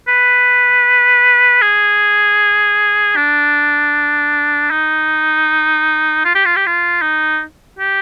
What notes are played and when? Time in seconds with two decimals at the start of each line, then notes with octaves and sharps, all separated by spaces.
0.08 B4
1.62 G#4
3.16 D4
4.70 D#4
6.25 F4
6.35 G4
6.45 F4
6.56 G4
6.67 F4
7.02 D#4
7.79 G4